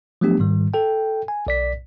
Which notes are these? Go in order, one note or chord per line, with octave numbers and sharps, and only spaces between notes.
F3 F#3 A3 B3 D4 G4
G#2 D#3 G3
A4 G5
G#5
B1 D5 B6